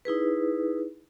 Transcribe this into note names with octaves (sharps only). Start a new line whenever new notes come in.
D#4 E4 G#4 B4